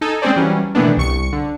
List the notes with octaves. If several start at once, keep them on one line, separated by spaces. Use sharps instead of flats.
D#4 A4 G#5
G#3 C4 C#4 G#4 C5 D5
E3 F#3 G3 C#4
B2 D#3 E3 A3 B3 D4
C2 C#6 C#7
D3